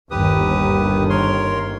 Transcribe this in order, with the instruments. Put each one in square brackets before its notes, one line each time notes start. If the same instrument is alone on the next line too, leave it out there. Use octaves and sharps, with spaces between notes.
[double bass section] G1 D#2 D#3 [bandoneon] G4 B4 D#6
[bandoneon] A#4 C#5 C6